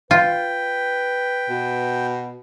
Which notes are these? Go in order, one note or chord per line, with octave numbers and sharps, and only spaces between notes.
F4 B4 G5
B2